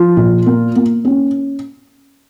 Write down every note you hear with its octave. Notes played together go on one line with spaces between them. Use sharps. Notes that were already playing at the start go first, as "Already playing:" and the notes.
Already playing: F3 F4
A#2
A#3
A#3
C#4